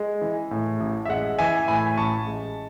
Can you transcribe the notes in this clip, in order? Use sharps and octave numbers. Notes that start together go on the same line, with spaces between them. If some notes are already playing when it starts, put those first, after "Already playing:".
Already playing: G#3
E3
A2
A1
E5
G#3 F#5
E3 E5 G#5
A2 G#5 B5
A1 A5 C#6
G#3